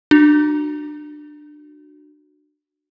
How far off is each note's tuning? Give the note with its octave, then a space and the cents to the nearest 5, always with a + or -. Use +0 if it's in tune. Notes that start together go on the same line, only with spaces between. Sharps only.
D4 +25 F#4 +0